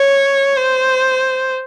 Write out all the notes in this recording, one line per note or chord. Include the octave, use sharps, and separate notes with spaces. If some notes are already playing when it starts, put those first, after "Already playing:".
Already playing: C#5
C5